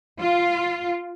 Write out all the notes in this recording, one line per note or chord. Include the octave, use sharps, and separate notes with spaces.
F4